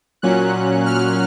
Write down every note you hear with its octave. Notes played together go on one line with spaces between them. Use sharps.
A#2 F#3 C#4 F#6
F6